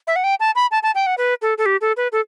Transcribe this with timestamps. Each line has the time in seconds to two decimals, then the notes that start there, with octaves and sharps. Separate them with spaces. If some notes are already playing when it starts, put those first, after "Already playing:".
0.07 E5
0.16 F#5
0.24 G5
0.40 A5
0.55 B5
0.71 A5
0.83 A5
0.95 G5
1.06 F#5
1.18 B4
1.42 A4
1.58 A4
1.66 G4
1.81 A4
1.97 B4
2.12 A4